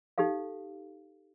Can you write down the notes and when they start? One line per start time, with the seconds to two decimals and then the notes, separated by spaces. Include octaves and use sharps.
0.18 D#4 G4 A4 F5